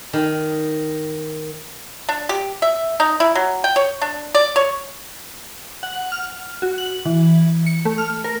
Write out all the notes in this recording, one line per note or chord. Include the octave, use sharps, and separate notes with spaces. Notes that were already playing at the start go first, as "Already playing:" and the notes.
D#3
D4
G4
E5
D#4
E4
F#3
G5
C#5
D4
D5
C#5
F#5
F6
F#4
F#7
E3
C#7
A3
F6
A#4